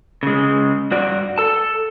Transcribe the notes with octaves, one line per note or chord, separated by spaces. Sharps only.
C#3 G#3
G2 F#4 D5
A4 A5